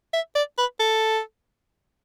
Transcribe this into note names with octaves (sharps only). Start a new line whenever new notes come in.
E5
D5
B4
A4